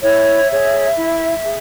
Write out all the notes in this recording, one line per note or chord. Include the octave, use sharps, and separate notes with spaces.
E4 C#5 E5
G#4 C#5
E4
G#4